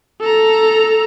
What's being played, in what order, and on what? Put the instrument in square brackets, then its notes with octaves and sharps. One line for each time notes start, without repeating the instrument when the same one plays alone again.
[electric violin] A4 A#5